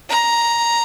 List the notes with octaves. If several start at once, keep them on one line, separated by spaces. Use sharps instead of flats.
A#5